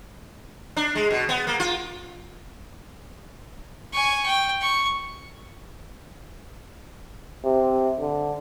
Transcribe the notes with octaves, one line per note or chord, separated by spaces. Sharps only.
D4
G#3
B2
B3
A#3
F4
G#5 C#6
G5
C#6
C3
D3